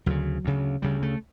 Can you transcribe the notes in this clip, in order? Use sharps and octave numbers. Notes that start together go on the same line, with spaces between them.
D2 C#3 F#3
D2 C#3
D2 C#3 G3
A3